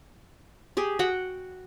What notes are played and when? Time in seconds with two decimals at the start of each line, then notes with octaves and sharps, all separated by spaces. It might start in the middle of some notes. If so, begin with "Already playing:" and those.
0.77 G4 G#4
0.99 F#4 F#5 G5